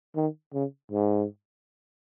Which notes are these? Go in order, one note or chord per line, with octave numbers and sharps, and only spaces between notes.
D#3
C#3
G#2